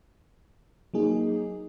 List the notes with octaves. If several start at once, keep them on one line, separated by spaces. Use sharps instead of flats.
F#3 A#3 D#4 G#4